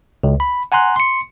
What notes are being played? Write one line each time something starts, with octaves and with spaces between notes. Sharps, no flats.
C#2
B5
F#5 G#5 A#5 C6 F#6
C6 C#7